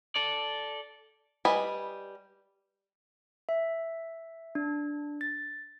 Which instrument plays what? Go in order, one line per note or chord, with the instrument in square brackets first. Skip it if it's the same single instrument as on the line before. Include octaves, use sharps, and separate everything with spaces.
[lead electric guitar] A4 D5
[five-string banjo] G3 B4 D#5 G#5 B5
[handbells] E5
D4
A6